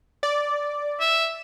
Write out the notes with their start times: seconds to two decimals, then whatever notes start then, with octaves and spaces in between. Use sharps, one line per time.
0.23 D5
1.00 E5